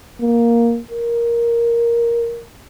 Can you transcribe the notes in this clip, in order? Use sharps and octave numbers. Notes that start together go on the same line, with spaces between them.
A#3
A#4